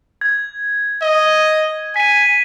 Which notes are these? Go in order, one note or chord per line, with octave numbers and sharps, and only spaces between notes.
G#6
D#5
G#5 B6 D#7